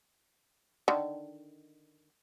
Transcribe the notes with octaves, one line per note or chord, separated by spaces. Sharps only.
D3 D#3